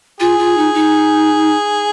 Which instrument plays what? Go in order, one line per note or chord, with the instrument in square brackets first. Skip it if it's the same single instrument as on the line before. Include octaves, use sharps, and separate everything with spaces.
[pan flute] F4 [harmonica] G#4
[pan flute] F4
D#4
D#4